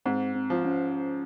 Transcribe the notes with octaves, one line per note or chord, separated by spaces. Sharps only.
G#2 C4
C4
F3
C#4